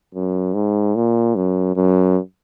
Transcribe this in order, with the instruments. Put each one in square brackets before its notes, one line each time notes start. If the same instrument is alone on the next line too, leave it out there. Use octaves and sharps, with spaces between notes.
[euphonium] F#2
G#2
A#2
F#2
F#2